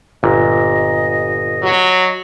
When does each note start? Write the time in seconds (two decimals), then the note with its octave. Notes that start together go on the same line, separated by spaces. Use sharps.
0.23 G1 A#2 D#5
1.63 F#3